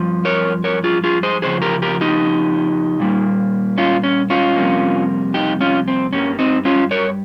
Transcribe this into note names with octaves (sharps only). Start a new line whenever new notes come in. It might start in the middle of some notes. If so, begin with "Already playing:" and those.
Already playing: G2 F3
A#4 C#5
A#4 C#5
F4 G#4
F4 G#4
G#4 C5
F2 C#3 F3 G#4 C5
G4 A#4
G4 A#4
D#4 G4
A#2 G3 A#3
C#4 F4
C#4
C#4 F4
F2 C3 G3 A#3
D#4 G4
C#4 F4
C4
G2 G3 A#3 C#4
C4 D#4
C#4 F4
A#4 C#5